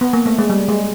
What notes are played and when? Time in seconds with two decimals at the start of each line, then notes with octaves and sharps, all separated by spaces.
0.01 B3
0.13 A#3
0.26 A3
0.38 G#3
0.50 G3
0.68 G#3